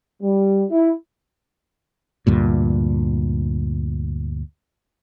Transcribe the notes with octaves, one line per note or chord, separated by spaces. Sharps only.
G3
E4
D2 G2 A#2